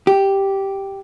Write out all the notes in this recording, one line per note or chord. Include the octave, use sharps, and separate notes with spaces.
G4